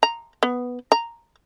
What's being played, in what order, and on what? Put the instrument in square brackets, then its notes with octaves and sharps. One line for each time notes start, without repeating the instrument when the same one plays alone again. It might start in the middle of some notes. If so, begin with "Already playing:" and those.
[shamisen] A#5
B3
A#5